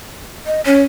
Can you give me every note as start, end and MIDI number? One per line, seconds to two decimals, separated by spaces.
0.46 0.61 75
0.66 0.83 61
0.66 0.81 73